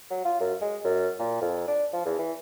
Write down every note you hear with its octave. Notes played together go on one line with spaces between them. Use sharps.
F#3
F4
F#2
G#3
F#2
A#2
F2
D4
F3
E2
E3